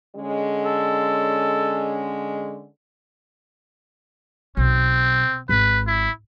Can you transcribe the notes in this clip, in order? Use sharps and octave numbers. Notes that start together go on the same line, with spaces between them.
D3 G#3 C#4
A4
B1 C4
G#1 B4
E4